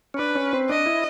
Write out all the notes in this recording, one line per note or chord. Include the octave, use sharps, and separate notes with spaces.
C#4
D4 B4
C#4
C4
D4 D#5
E4